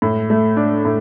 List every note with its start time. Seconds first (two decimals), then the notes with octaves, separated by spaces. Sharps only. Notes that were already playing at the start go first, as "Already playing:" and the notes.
0.02 A2
0.30 A3
0.57 D4
0.85 A2